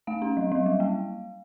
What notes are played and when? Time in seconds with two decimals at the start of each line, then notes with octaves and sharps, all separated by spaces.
0.07 A3 F5
0.22 C#4
0.37 F#3
0.52 F#3
0.66 G3
0.80 A#3